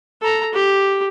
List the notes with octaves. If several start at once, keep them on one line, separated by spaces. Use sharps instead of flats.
A4 A#5
G4